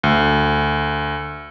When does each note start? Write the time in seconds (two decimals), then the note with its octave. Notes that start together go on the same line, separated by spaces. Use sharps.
0.04 D2